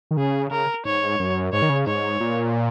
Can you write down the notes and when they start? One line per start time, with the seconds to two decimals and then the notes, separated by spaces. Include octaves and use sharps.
0.11 D#3
0.17 C#3 G#4
0.51 C#3 A#4
0.85 G#2 C#5
1.19 F#2
1.52 G#2 C#5
1.62 D#3
1.69 C#3
1.87 G#2 C#5
2.20 A#2